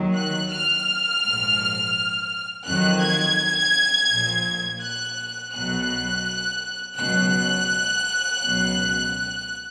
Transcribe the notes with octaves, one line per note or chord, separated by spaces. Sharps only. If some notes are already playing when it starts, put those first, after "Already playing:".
Already playing: D#2 D#3 F#3
F#6
F6
A#1 G#2 F3
F2 D#3 F#3 F#6
G#6
A#1 A#2 F3
F#6
B1 B2 F#3 F#6
C#2 B2 F#3 F#6
C#2 B2 F#3